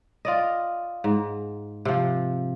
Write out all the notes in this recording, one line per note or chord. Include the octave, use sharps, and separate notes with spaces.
F4 D5 D#5
G#2
C3 F3